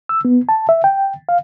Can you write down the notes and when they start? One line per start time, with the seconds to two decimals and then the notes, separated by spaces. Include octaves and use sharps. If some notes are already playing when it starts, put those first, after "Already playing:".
0.09 E6
0.25 B3
0.49 A5
0.69 E5
0.84 G5
1.29 F5